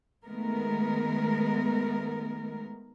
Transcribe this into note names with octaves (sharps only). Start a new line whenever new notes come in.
D#3 G#3 A3 B3 A#4